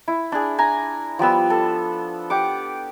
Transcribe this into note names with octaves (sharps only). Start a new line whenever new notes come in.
E4
D4 G#4
G#5 A#5
F3 G3 B3 E6
A4
G4 F#5 D6